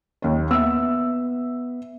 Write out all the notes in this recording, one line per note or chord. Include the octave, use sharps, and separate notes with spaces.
D#2 C#5
B3 E5 E6